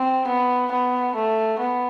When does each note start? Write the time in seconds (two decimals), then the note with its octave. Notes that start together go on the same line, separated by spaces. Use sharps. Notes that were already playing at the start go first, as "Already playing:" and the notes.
Already playing: C4
0.27 B3
0.71 B3
1.15 A3
1.59 B3